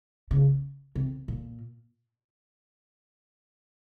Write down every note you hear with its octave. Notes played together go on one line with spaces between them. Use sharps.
C#3
C3
A#2